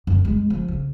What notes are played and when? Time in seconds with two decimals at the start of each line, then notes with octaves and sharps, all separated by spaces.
0.07 F#2
0.25 G#3
0.50 F3
0.68 C#3